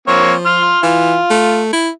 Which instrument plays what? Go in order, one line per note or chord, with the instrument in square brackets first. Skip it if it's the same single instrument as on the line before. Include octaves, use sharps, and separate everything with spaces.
[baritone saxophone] F3 [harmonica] A#3 C4 C#5
[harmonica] C6 F6
[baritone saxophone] E3 [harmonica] F4
[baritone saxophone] A3
E4